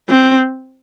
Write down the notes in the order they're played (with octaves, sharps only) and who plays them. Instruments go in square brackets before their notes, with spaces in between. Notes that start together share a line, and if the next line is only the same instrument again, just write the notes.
[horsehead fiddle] C4